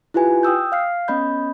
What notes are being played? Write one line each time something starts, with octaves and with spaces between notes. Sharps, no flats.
E4 F4 G4 B4 G#5
G5 D#6 E6 G6
F5 F6 C7
B3 C#4 D#5 B5 G6